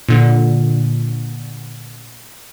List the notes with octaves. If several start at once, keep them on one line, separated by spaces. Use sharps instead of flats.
A#2 D3